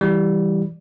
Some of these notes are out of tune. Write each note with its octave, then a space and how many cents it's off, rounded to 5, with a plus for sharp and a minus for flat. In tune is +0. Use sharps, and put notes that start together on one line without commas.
E3 +0 G3 +0